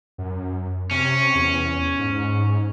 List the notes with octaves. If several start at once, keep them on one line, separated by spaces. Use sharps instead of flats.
F#2
C3 C#4
E2
G#2